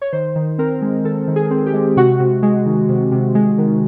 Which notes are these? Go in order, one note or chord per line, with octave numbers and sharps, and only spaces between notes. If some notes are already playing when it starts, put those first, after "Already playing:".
C#5
D#3 C5
D#3
C4 A#4
G#3
D#3 A4
D#3
G#4
C4
G4
G#3
C3 F#4
C3
G#3
D#3
C3
C3
G#3
D#3